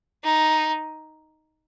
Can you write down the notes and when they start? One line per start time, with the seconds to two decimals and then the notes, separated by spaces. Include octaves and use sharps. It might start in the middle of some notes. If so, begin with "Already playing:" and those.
0.24 D#4